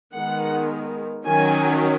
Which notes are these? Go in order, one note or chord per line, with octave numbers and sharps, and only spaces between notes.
D#3 G#3 B3 F#5
D#3 F#3 C#4 G#5